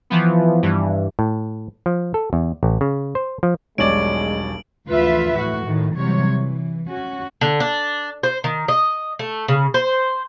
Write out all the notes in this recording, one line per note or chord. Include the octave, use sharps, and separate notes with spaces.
E3 F3 B3
G2 E3
A2
F3
A4
E2
A1
C#3
C5
F3
E1 B1 G3 G#3 C#5 D5 D7 F#7
D2 E3 F3 F4 B4 E5
A2 F#4
A2 D#3
C3 E3 F#3 G3 C#5
E3
C#4 F#4
D3
D4
C5
D#3
D#5
A3
C#3
C5